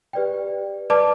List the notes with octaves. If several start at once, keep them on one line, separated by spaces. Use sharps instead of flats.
G4 B4 D5 G5
B4 D5 A5 D6